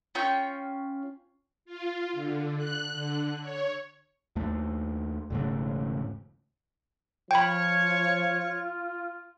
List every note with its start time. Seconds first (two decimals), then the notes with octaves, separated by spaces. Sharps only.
0.15 C#4 F4 G5 C#6
1.65 F4
2.13 D3
2.57 F#6
2.93 D3
3.40 C#5
4.36 D#2 A3
5.30 E1 G#2 C#3 A3
7.31 F3 F4 C#5 G5 B5